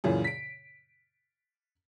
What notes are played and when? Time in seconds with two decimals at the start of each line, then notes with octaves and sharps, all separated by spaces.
0.04 F#2 A#2 C#3 E3
0.24 B6 D7